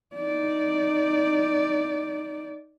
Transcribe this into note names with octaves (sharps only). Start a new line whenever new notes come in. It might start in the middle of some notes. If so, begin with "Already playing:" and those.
D#4 D5